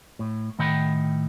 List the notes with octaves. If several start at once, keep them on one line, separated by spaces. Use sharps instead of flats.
A2
A2 D#3 D#5 F#5 G5 B5